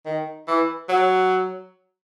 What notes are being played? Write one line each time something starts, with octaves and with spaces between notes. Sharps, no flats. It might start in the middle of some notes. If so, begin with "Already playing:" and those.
D#3
E3
F#3